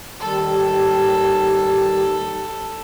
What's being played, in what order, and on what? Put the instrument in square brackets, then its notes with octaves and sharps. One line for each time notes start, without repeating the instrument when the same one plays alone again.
[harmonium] D#2 D#3 G3 [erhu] A4